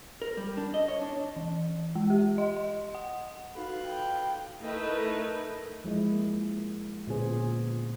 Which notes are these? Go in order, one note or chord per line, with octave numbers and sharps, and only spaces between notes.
A#4
G3
D4
D#5
C#5
D4
E3
G#3
G4
D#5
D#5
F#5
D#4 F4 F#4 A4 B4
G5
A3 D#4 E4 A#4 B4
F3 G#3 E4 D#5
A#3
A#2 D3 B3 C#4 G#4 C5